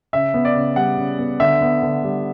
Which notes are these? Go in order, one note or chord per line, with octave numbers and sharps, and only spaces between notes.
C#3 E5
B3
D5
C#3
G3 F#5
C#3
B3
D3 E5
B3
D3
G3